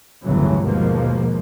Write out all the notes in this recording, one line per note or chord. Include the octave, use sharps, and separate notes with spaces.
G1 D2 A2 C#3 E3 F#3
D#2 B2 F3 G#3 A#3